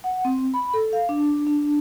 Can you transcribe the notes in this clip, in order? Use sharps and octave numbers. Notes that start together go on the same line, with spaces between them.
F#5
C4
B5
A4
F5
D4
D4